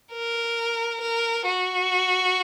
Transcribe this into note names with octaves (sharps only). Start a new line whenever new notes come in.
A#4
A#4
F#4